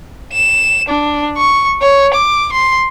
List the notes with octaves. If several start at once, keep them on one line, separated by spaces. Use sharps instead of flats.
E7
D4
C#6
C#5
D6
C6